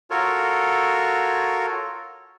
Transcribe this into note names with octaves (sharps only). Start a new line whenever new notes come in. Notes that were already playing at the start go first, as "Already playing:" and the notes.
F4 F#4 A4 A#4 C#5